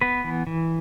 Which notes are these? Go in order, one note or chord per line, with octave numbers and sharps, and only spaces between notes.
B3 B4
E3
E3